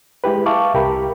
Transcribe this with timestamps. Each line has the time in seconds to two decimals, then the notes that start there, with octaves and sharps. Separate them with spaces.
0.24 G#3 E4 G4 B4
0.46 E5 F5 A5 C#6 D6
0.74 C2 G4 A#4 B5